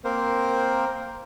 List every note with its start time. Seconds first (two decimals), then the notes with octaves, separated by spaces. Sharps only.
0.04 A#3 C4 A#4 C5